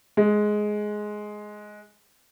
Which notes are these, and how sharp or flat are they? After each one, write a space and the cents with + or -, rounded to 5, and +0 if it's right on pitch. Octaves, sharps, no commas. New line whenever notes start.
G#3 +10